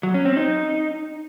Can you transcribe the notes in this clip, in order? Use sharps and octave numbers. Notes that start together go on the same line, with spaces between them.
F#3
C#4
C4
D#4